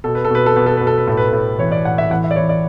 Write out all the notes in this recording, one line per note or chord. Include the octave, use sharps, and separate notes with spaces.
B2 A4
B4
A4
B2 B4
A4
B2 B4
A4
B2 B4
A4
B4
A2 A4
B4
A4
A2
E3 C#5
D5
A2 F#5
E5
E3 F#5
E5
D5
E3 C#5
D5